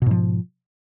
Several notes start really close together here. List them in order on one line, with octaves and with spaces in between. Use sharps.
B2 G#2 F3